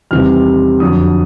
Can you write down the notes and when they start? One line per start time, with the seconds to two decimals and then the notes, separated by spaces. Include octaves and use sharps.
0.11 E2 C3 D#3 G3 F6
0.80 F2 D3 F#3 D#6